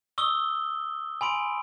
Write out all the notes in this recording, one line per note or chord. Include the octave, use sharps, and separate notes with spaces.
C#6 D#6 E6 G7
G#5 B5 C6 D7